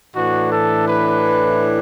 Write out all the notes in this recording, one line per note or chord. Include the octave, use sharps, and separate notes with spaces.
A2 E3 D4 F#4
A4
B4